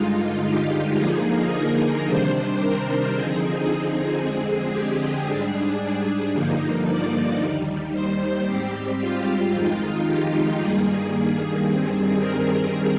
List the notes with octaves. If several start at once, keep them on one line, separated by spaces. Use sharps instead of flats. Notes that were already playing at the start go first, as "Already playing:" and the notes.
Already playing: G2 D3 G#3 D#4 F4
G4
D3 F3 A#3 D#4 G#4
A#4
C3 D#3 G3 D4 C5
A#4
D3 F3 C4 D#4 G#4
F2 D3 G#3 C4
G4
G#2 G3 D4 G#4
G2 D3 F3 A#3 D#4
D5
D#2 D#3 G3
C5
G#2 G3 C4 G4
F4
F2 D#3 G#3 D#4
G4
G2 D#3 G3 A#3 G#4
G2 D#3 G3 C4
A#4